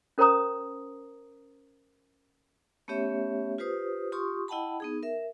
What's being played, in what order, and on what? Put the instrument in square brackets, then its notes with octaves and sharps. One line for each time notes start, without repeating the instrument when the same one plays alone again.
[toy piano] C#4 A#4 C5 C#5 A#5 D#6
[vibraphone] A3 B3 C#4 G4 C#5 E5
F4 G4 B4 C5 D#6
F4 G4 C6 C#6 D#6
E4 D#5 F#5 G5 A5 B5
B3 D#4 G#4
A#4 E5